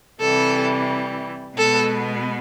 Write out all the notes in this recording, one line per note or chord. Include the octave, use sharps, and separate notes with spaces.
C3 E3 G3 A4
B2 G#3 B3 A4